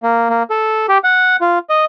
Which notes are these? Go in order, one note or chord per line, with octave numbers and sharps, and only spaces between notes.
A#3
A#3
A4
G4
F#5
F4
D#5